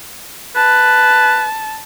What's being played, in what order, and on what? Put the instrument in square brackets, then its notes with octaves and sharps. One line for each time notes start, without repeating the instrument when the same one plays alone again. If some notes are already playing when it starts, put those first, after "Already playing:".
[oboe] B4 [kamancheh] A5